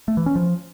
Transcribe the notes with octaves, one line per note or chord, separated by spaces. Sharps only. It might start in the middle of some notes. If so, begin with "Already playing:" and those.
A3
E3
C#4
F3